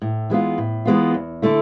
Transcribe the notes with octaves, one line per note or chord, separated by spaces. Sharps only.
A2
E3 G#3 B3 F4
A2
E3 G#3 B3 F4
E2
D3 A3 E4